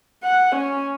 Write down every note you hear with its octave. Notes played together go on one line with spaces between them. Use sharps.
F#5
C#4